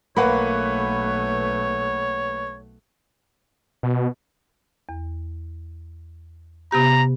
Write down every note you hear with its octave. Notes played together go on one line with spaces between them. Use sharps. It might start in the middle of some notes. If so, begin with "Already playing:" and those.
B1 A3 A#3 B4 C#5 F#5 B5
B2
E2
C3 B3 G4 A#5